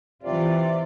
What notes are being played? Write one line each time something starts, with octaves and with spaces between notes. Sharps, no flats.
C3 E3 F4 D5